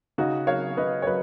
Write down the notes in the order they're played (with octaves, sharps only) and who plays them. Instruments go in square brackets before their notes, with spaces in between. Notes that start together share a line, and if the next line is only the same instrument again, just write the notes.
[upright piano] C#3 D#4 F#4
F#3 C#5 F5
C#3 B4 D#5
C#5
F#3 B4 D#5